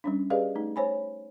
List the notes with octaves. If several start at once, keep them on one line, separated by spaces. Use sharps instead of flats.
G3 C#4 D4
G4 G#4 B4 D5 D#5 F5
A3 D#4
C5 C#5 G#5 B5